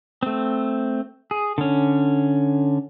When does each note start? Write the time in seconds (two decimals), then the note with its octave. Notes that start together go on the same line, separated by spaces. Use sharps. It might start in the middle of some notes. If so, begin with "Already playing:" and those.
0.23 A3 C4
1.31 G#4
1.58 D3 C#4